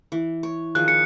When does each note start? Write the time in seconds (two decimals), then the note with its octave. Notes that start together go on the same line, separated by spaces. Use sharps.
0.12 E3
0.43 C#5
0.75 D#3 F3 G#4 F#6
0.88 G#4 C#7